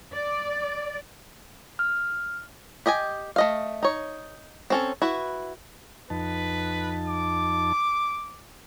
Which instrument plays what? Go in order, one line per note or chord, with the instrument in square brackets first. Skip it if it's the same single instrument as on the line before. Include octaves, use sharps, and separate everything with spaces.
[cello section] D5
[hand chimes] F6
[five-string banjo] G4 D#5 G5 G#5
A3 D#5 F5
D#4 C#5
C4 C#4 A4
E4 F#4 B4
[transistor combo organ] F2 D#4 A5 [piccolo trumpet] B4
[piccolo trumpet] D6